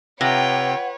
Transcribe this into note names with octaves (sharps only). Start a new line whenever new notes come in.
C3 F4 B4 C#5 F#5 G5